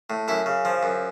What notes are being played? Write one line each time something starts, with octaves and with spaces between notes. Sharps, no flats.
A2
F#2 E4
C#3
F3
F#2